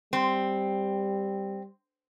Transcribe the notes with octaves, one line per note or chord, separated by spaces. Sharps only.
G3 C4